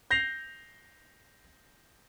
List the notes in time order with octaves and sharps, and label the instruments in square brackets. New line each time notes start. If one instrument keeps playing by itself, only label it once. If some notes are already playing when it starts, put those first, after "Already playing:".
[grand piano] G6 A#6 C7 F7